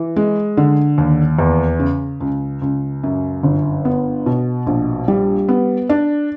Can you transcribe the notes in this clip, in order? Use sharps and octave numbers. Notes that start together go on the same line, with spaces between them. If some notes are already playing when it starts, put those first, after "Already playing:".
Already playing: E3
G#3
D3
D#2
E2
C#3
C#2
C#2
F#2
G1
B3
B2
A#1
G3
B3
D4